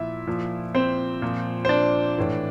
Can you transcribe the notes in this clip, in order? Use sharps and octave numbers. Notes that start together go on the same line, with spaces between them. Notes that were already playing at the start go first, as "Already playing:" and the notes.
Already playing: A#2 F3 E4 F4 E5
A#2 F3
C4 C5
A#2 F3
C5
D4 D5
A2 E3